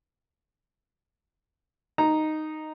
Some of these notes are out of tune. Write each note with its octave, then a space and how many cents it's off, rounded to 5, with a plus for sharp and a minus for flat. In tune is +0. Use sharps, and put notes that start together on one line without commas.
D#4 -5 A#5 +0